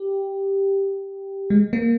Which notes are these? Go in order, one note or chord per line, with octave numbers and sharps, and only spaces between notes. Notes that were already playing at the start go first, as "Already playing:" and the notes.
Already playing: G4
G#3
A#3